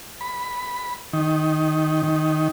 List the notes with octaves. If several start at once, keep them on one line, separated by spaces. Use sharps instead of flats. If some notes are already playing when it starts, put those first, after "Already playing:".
B5
D#3
D#3